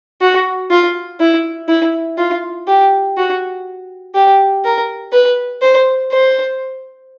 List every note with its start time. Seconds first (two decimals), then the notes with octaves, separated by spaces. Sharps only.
0.21 F#4
0.70 F4
1.20 E4
1.68 E4
2.17 F4
2.68 G4
3.17 F#4
4.14 G4
4.64 A#4
5.12 B4
5.62 C5
6.12 C5